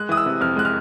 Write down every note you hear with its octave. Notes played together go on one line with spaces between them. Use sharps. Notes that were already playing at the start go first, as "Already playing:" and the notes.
Already playing: G#3 F#6
E3 D#6
E6
C3
F2 F6
G#3 F#6
F6